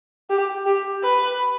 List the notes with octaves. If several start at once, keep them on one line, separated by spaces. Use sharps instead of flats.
G4
G4
B4